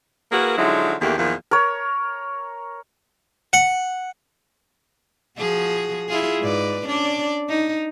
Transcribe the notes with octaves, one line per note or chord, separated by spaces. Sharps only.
A#3 E4 F#4 G#4 A#4 B4
D3 F3 F#3 G#3 D#4 E4
E2 D3 D#3 A3 A#3 G4
E2 A#2 D#3 F3
A#4 C#5
F#5
F3 F#4 G#4
E4 F4 G#4
G#2 B4 D5
C#4 D4 D5
D#4